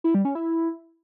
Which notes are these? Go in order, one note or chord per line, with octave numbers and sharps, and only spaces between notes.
E4
G3
C#4
E4